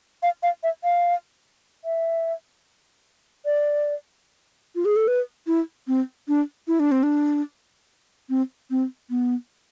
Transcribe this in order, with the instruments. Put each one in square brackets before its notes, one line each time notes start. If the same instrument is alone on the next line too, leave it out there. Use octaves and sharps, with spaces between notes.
[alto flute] F5
F5
E5
F5
E5
D5
F4
G#4
A4
B4
E4
C4
D4
E4
D4
C4
D4
C4
C4
B3